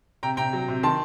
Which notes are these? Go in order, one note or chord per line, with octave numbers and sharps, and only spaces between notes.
C3 G5 A#5
C3 G5 A#5
F#3
C3
D#3 A5 C6